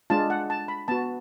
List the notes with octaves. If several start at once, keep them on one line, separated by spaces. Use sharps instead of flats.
G#3 D4 F4 A5
F#5
A5
B5
B3 F#4 A5